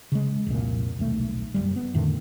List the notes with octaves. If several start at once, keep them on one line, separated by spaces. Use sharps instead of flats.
C#3 G#3
F1 C2 A#2
D#1 B1 A3
F#1 G3
B3
F2 A2 D3 D#3